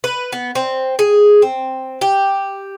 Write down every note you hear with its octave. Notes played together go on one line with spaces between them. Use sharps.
B4
B3
C4
G#4
C4
G4